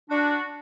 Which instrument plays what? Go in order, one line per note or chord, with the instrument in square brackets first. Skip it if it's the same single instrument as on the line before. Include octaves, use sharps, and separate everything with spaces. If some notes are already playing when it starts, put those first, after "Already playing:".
[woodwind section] D4 F#4